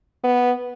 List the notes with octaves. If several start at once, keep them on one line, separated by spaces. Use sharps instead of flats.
B3